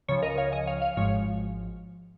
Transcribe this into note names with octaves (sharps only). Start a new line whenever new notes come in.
C#2 C#3 F3 C#5
A#4 D#5
C#5 F5
D#5 G#5
C#5 F5
C#5 F5
G#1 G#2 F3 G#3 C#5 F5